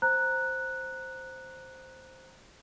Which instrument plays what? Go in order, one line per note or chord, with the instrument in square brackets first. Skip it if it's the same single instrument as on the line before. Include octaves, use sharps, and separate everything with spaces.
[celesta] C5 A#5 F#6